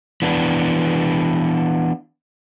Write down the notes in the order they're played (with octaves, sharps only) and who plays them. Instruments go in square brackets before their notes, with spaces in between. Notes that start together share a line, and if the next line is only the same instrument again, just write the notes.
[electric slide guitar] E3 B3 D4